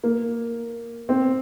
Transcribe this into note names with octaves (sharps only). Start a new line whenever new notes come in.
A#3
C4